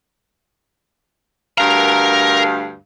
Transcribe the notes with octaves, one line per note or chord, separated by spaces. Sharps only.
D2 G2 A#4 F5 A#5